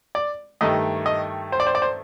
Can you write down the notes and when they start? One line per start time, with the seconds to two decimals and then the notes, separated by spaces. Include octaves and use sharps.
0.15 D5
0.61 G2 D#3 A3 D#5
1.06 D#5
1.52 C5
1.60 D5
1.67 C5
1.75 D5
1.82 C5